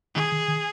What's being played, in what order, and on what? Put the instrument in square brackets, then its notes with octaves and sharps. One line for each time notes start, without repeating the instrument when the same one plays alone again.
[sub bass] D#3 [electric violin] G#4
[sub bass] D#3
D#3